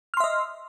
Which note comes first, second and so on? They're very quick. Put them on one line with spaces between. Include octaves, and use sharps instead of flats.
F6 C6 E5 D#5